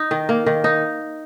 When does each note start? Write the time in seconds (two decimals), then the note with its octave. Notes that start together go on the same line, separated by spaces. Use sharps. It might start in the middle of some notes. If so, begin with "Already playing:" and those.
Already playing: D#4
0.11 D#3
0.29 A#3
0.46 D#3
0.64 D#4